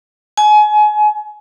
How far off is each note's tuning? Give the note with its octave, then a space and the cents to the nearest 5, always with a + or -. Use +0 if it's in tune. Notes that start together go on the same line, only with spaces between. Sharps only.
G#5 +30